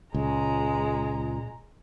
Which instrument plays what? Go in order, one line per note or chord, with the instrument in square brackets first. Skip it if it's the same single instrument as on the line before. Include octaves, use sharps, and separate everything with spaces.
[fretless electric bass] C#2 [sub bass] A#2 [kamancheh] G#3 A#5